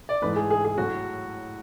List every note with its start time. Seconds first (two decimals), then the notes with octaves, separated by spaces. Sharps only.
0.09 D5
0.22 G#2 E3 A3 B4
0.36 G#4
0.50 G#4
0.65 G#4
0.78 A2 F#3 A3 F#4